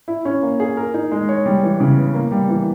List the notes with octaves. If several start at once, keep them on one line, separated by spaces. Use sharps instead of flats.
E4
C#4
A#3
G#4
A#4
D#4
G#3
C#5
G3
E3
C#3
B3
A#3
G3
E3